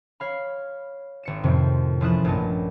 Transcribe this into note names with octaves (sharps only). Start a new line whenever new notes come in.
C#5 F5 B5
G#1 C#7 E7
F2 A2 C3 D#3
A1 F3 E4 D#6 F#6 E7
A#1 G2 A3 C#4 D#5 A5